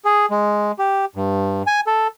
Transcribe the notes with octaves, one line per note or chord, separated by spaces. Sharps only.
G#4
G#3
G4
G2
G#5
A4